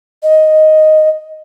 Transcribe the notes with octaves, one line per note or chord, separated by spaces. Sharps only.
D#5